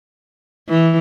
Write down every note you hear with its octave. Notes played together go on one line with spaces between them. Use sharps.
E3